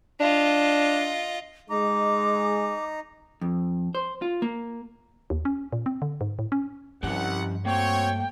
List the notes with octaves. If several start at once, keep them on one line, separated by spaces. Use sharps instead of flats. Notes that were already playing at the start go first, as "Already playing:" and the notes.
D4 F4 D#5
G#3 D#4 A#5 D6
F2
C5
F4
A#3
D#2
C#4
A#2
C4
D3
G#2
A2
C#4
C2 G2 F3 C#4 G4 F#5
A3 A#3 C4 F#4 C#5 G5